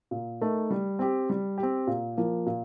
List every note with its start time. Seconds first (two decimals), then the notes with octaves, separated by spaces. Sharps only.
0.11 A#2
0.41 A3 D#4 A#4
0.71 G3
0.99 C4 G4
1.30 G3
1.58 G4
1.63 C4
1.87 A#2
2.17 F3 A#3
2.46 A#2